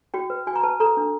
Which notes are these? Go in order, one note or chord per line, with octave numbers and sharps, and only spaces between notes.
F#4 G5
B4
F#4 G#5
A#5
B4 A5
A4 A#5
D4